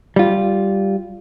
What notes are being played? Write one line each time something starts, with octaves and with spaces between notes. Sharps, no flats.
G3 F4